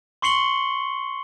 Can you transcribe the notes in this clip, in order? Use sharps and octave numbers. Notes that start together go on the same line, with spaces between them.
C6 C#6 C7 C#7 F#7 G7